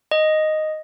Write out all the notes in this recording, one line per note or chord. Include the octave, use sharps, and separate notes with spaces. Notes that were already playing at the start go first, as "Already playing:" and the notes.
D#5